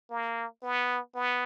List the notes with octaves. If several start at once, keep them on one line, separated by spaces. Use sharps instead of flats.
A#3
B3
B3